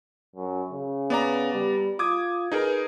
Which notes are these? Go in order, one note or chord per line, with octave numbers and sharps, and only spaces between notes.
F#2
C#3
B3 D5 A#5
G3
F4 D6 D#6 G#6
D#4 G#4 A#4 B4